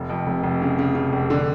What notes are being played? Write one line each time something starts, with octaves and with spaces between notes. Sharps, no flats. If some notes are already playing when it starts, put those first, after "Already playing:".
Already playing: F1
F2
F1
F1
C#3
C#3
C#3
F1
D3